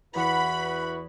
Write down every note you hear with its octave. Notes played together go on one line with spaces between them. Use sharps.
E2 E4 F#4 B4 F#5 B5 C#7